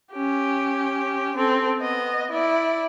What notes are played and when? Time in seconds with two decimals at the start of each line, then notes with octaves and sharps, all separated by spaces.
0.13 C#4 G4
1.37 C4 A4
1.81 B3 D#5
2.31 E4 D5